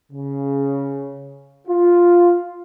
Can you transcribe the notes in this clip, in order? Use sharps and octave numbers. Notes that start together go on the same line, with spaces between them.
C#3
F4